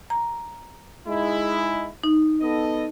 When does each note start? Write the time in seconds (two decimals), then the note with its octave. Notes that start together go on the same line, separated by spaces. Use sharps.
0.10 A#5
1.07 G#3 D#4 E4
2.04 D#4
2.41 B3 A4 D#5